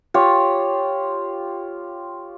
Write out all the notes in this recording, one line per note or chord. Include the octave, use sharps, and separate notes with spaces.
F4 G4 C#5